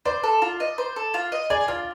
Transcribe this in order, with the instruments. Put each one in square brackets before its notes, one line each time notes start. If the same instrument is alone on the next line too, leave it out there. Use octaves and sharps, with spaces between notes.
[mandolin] C5 [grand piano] D5
[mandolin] A4
F4
D#5
C5
A4
F4
D#5
[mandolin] G#4 [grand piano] D5
[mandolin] F4 [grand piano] D5